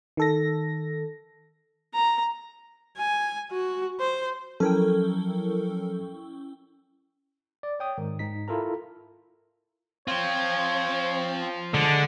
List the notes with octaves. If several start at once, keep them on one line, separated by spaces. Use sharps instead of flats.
D#3 A4 A#6
A#5
G#5
F#4
C5
F3 F#3 C#4 E4 A4 A#4 G5
D5
C#5 G5 D#6
G#2 D#3
G#2 D#4 B6
E4 F4 A4 A#4 A#5
C4 F4 C5 C#5
D3 G#3 A5